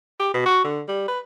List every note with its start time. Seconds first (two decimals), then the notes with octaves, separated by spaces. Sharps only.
0.20 G4
0.34 B2
0.46 F#4
0.64 D3
0.89 G3
1.08 B4